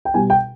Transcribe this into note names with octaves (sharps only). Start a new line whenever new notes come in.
G5
B2 G3 G#5
G5